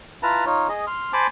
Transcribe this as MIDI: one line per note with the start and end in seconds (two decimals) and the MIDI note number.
0.23 0.45 64
0.23 0.45 65
0.23 0.45 71
0.23 0.45 81
0.23 0.45 82
0.46 0.68 63
0.46 0.68 65
0.46 0.68 73
0.69 0.85 68
0.69 0.85 75
0.87 1.12 84
0.87 1.12 89
1.13 1.27 72
1.13 1.27 80
1.13 1.27 81
1.13 1.27 83
1.13 1.27 84
1.13 1.27 86